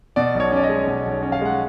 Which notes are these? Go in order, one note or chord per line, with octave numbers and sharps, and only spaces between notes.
B2 D5
B1
C#5
C#4 D5
D#5
G#3
B2
B1
C#4
F5
G#3 F#5